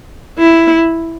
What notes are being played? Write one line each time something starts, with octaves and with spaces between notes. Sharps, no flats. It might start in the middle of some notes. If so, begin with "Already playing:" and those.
E4